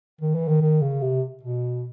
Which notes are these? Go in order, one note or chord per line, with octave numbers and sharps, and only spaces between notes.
D#3
E3
D#3
D#3
C#3
C3
B2